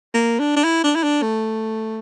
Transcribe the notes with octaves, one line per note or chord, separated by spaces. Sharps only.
A#3
D4
D4
E4
D4
E4
D4
A3